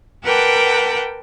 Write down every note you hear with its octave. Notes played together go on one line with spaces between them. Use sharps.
A#4 B4 F#5 G5 A5 D6